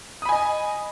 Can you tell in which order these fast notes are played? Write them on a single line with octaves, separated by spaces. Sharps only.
D#6 B5 G#5 D#5